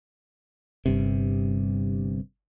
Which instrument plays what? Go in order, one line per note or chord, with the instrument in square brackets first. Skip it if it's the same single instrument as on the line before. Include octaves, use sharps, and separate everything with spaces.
[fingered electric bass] G1 G2 C3